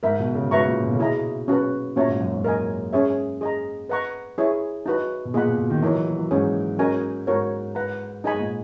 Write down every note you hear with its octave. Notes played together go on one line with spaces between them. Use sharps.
G#2 A#4 E5 B5
B2
C#3
G#2 F#4 B4 E5 A#5 C#6
A#2
B2
C#3
B2 E4 G#4 D#5 A#5
C#4 F#4 B4
A#2 C#4 F#4 C#5 E5 A#5
G#2
F#2
G#2
A#4 D#5 G#5
C#4 G#4 C#5 E5
G#4 D#5 A#5
B4 D#5 F#5 A#5 C#6
E4 G#4 C#5 E5 G#5
D#4 F#4 B4
B2
A#2 G#4 D#5 F#5 B5
B2
B2
D#3
E3 D#4 A#4 C#5
F#3
F#3
F#3
G#2 C#4 G#4 C#5
C#4 F#4 A#4 D#5 G#5
G#2 F#4 A#4 C#5
B4 F#5 A#5
D#4 G#4 D#5 G#5 B5
G#2
A#2